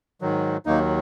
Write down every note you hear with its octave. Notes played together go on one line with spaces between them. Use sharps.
G#2 D#3 F#3
D#2 D#3 F#3 A#3 D#4